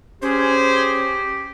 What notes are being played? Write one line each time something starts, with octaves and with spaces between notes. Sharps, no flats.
C#4 G4 G#4 C5